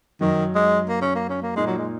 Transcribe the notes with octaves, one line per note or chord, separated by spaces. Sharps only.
F#2 D#3 F#3 D#4
G#3
A#3
C#4
A#3
C#4
A#3
A#2 G#3 A#3 D#4
F#3
G#3